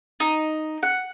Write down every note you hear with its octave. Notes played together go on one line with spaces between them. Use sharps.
D#4
F#5